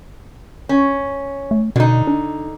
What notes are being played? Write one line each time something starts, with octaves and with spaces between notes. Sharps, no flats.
C#4
A3
B2 D3 D#4
D4